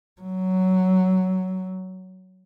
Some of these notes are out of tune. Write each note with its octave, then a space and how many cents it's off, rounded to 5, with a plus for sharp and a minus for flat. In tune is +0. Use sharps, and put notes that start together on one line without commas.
F#3 +10